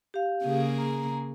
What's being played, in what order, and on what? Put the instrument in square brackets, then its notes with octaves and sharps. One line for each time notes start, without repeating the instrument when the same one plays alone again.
[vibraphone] G4 F5
[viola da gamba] C#3 A#3 G#4
[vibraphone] A#5